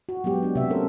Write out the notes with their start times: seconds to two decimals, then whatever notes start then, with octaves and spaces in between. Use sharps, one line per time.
0.09 F#4
0.24 F#3 G#3 B3 G4
0.43 B3 D4
0.55 C3 E5
0.70 A3 C#4 A4 A#4 C5